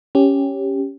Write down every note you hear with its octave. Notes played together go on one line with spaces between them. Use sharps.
C#4 G4